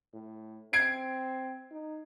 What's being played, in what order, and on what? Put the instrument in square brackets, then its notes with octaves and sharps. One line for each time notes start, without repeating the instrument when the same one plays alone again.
[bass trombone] A2
[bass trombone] C4 [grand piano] G#6 C7 D7
[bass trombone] D#4